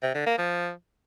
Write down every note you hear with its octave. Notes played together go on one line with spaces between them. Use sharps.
C3
D3
A#3
F3